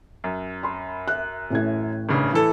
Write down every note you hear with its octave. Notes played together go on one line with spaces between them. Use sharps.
F#2
B5 C6
E5 F#6
A1 A2 G#6
G#1 G2 C#3
E3 E4 A4